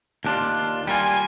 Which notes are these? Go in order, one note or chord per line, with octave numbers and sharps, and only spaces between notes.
D#2 D4 F4
G3 A#3 F4 G#5